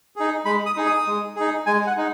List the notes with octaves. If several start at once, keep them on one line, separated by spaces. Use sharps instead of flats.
D#4 G#4
G#3 B5
D#6
D#4 G#4
D#6
G#3
D#4 G#4
G#3 G#5
F#5
D#4